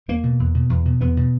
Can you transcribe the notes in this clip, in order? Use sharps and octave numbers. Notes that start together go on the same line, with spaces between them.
E2 A#3
B2
E2
B2
E2
B2
E2 B3
B2